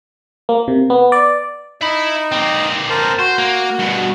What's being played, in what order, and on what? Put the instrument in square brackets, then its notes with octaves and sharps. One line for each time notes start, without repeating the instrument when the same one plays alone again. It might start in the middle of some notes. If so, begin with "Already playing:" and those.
[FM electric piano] A#3
C3
B3
D5
[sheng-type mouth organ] D#4 [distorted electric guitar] E5 B5
[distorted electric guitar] A#3 C4
[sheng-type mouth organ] A#4 C5 A5
[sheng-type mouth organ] F#4 [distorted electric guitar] C5
[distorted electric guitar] A#3
G2 B2